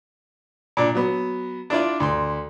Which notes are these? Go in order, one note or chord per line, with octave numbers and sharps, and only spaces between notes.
A#2 D4
F#3 B3
D4 E4 F4 D5
D2 C6